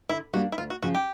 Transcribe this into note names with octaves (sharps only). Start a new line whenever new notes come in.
D3 E4
G3 A#3 D4 F#4
E4
D2 F4
F#4
C#3 F3 F#4
G4